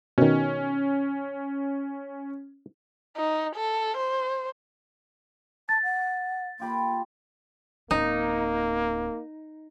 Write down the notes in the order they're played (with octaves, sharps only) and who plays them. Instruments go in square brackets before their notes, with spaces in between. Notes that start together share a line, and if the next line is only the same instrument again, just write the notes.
[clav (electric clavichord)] B2 D#3 [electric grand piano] C#4
[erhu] D#4
A4
C5
[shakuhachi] A5 [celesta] A6
[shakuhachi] F#5
[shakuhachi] A#3 [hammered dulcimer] F4 G4 B5
[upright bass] D1 C#4 [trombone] A#3 [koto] D#4